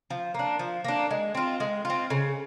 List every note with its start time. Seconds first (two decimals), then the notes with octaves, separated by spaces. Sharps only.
0.10 F3
0.34 A#3 D4
0.59 F3
0.84 A#3 D4
1.11 G#3
1.35 C4 F4
1.60 G#3
1.85 C4 F4
2.10 C#3